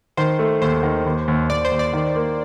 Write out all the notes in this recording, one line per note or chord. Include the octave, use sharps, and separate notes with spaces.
D#3 C5
A3
D#2 C5
D#3
D#2
D#2
D#2 D5
C5
D#2
D5
D#3
A#3